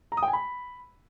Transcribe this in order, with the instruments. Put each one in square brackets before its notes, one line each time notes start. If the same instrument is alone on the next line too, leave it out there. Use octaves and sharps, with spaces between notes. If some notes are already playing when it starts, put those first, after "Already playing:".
[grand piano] A#5
D#6
G5
G#5
B5